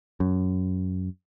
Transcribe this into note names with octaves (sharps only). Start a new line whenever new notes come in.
F#2